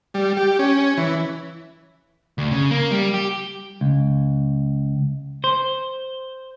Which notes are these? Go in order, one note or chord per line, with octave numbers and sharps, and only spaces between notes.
G3
G4
C#4
E3
D2
C#3
A#3
G3
G4
C#2
C5